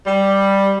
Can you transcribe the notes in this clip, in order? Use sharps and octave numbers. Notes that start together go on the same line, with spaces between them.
G3